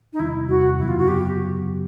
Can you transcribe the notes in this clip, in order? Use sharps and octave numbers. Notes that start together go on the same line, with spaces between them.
D#4
E2 C3 D#3 G3 C4 E4
E2 C3 D#3 G3 C4 F#4
F#2 C#3 F#3 B3 E4
F4
F#4
C#3 F#3 B3 G4